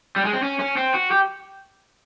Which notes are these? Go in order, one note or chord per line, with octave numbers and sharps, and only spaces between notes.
G3
G#3
C4
C#4
C#4
C4
F#4
G4